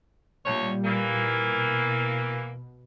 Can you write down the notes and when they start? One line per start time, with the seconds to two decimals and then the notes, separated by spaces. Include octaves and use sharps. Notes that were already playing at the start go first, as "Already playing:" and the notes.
0.45 D2 A#2 G3 C#5
0.85 E3 A#3
1.43 B2